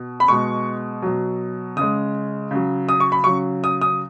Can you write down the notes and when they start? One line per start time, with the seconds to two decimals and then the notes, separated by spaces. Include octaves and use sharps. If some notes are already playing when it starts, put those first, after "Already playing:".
Already playing: B2
0.20 B5
0.28 B2 G#3 C#6
1.02 B2 F#3
1.77 C#3 G#3 D#6
2.51 C#3 F#3
2.89 D#6
3.00 C#6
3.12 B5
3.24 C#3 F#3 C#6
3.64 D#6
3.81 D#6